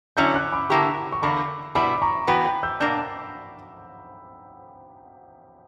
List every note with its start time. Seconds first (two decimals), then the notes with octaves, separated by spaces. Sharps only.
0.17 D3 F#3 C#4 E4 E6 G6
0.34 D6 F#6
0.52 B5 D6
0.70 D3 A#3 E4 G4 A#5 C#6
1.12 C#6
1.22 E2 D3 A#3 B5 D6
1.75 B2 G3 B3 E4 B5 D6
2.02 A#5 C#6
2.27 E3 B3 F#4 B4 G5 B5
2.45 G5 B5
2.63 E6 G6
2.80 B2 A#3 D4 E6 G6